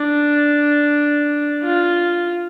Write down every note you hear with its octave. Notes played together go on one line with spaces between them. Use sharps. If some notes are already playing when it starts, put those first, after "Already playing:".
Already playing: D4
F4